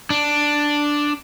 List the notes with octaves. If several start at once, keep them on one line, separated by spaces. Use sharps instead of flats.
D4